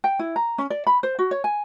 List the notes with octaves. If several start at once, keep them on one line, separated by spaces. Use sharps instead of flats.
G5
E4
A#5
C#4
D5
B5
C5
F#4
C#5
G#5